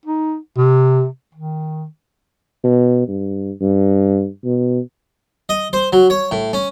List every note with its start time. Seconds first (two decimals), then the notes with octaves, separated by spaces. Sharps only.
0.06 D#4
0.57 C3
1.35 D#3
2.64 B2
3.08 G2
3.61 G2
4.44 B2
5.49 D#5
5.73 C5
5.93 F#3
6.10 C#5
6.31 A2
6.53 C#4